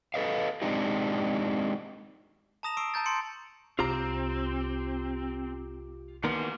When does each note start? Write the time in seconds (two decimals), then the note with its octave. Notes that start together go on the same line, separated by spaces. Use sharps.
0.14 A4 B4 D#5 F5
0.62 G#3 C4 D4 D#4 G4
2.63 A5 A#5 D#6 A#6 E7 F7
2.77 C#6 E6 C7 D7
2.94 A5 A#5 G6 A6
3.06 C6 C#7 D7
3.79 C2 C4 F4 G4 A#5
6.24 D#3 E3 A#3 B3 C6